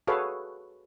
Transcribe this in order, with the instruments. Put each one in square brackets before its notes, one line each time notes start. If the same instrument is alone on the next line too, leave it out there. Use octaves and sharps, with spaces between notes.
[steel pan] F#4 G#4 A4 B4 C#5 F5